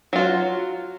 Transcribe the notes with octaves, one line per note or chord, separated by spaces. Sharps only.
F#3 F4 F#4